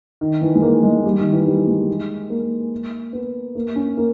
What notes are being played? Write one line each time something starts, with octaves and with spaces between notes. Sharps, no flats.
D#3
E3
G#3
A#3
G#3
G3
D#3
E3
G3
G#3
A#3
B3
A#3
C#4
A#3